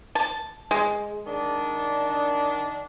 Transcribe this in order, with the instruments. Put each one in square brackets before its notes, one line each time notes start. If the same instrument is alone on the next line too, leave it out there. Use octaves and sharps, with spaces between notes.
[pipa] A5
G#3
[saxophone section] D#3 D4